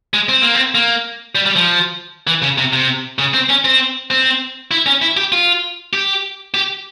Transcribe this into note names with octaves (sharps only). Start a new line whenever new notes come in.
G#3
C4
A#3
C4
A#3
G3
G3
F3
E3
C#3
C3
C3
C#3
C4
C#4
C4
C4
E4
C#4
E4
G4
F4
G4
G4